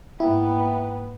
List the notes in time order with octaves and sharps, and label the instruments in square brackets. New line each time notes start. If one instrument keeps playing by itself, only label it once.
[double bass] G#2 [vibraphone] A#3 G5 [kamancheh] B3 B4 [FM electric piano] E4